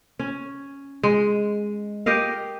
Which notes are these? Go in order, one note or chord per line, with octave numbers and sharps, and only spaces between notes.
C#4
G#3
G4 A#4 D#5 F5